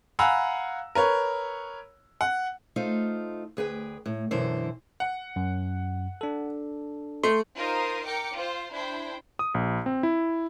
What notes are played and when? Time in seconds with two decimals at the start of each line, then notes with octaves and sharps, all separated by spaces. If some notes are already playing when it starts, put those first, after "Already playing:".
0.19 F5 F#5 G#5 A#5 B5 E6
0.95 A#4 B4 C#5
2.21 F#5
2.76 A3 D#4 F4 C5
3.57 D2 G#4 B4 G5
4.06 A2
4.31 F#2 B2 D3 E3 C5
5.00 F#5
5.36 F#2
6.21 D4 A4
7.24 A3 C6
7.57 D#4 F4 A#4 C5 D#6
8.06 A#4 G5 D6 C#7
8.34 F4 C5
8.73 D4 E4 C5 G5
9.39 D#6
9.54 A#1
9.86 C4
10.03 E4